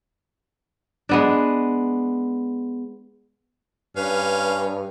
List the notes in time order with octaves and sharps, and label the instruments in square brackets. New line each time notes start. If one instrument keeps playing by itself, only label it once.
[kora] G#3 B3 D4
[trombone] G2 [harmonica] C#4 F5 [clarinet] B4